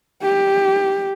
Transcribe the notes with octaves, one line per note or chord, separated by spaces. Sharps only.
G4